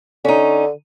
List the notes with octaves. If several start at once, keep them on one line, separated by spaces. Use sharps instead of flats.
D3 C#4 D#4